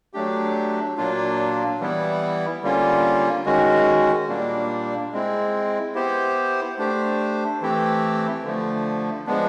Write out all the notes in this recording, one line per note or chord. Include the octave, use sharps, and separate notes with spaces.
F#3 A3 D4 G4
A#2 F#3 A#3 D4 F4
E3 G3 B3 E4
D3 G3 A#3 C#4 F4
D#3 G#3 C#4 F#4
A#2 G3 A#3 D4
G#3 C4 E4
B3 E4 G4 C5
A3 D4 G4 C5
E3 A3 C4 E4 G4
D3 F3 A3
F3 G#3 B3 D4